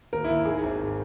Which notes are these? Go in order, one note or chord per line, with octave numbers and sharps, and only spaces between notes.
D#2 A#4
D#2 E4
D#3 G#4
G#1